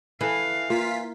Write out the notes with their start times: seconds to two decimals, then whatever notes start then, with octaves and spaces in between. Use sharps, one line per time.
0.21 E3 E4 A4 F5
0.70 A#3 F4 B6